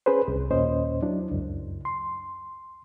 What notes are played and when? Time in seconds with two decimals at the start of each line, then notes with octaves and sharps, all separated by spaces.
0.06 C#4 G#4 B4 C5
0.28 C2
0.51 D#2 A#2 C#4 C5 D#5
1.02 F#3 D4 E4
1.31 C#2 F#2
1.85 C6